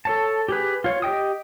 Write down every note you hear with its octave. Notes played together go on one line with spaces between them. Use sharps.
A4 C#5 A5
G4 G#4 B4
F4 C#5
G4 D#5 G5 D#6